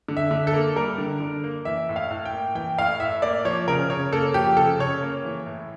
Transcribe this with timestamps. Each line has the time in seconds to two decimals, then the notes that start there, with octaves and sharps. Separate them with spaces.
0.08 D3
0.17 E5
0.31 D3
0.47 A4
0.53 A#3
0.76 G3 A#4
0.98 D3
1.21 D3
1.44 A#3
1.65 E3 E5
1.89 A2
1.96 F5
2.11 A2
2.25 G5
2.33 A#3
2.55 E3 G5
2.78 A2 F5
3.00 A2 E5
3.22 A#3 D5
3.45 F3 C#5
3.68 C#3 A#4
3.90 C#3 C#5
4.13 A#3 A4
4.34 F3 G4
4.57 C#3 A4
4.79 C#3 C#5
5.03 A#3
5.25 E3
5.46 A2